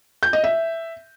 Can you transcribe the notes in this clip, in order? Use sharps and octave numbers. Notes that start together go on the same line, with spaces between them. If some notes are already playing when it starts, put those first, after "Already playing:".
G6
D#5
E5